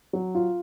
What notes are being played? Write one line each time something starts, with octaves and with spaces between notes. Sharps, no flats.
F#3
F4